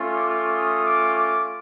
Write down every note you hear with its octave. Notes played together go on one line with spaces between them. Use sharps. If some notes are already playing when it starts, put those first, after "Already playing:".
Already playing: A3 C#4 F4
D6
D#6
D6
D6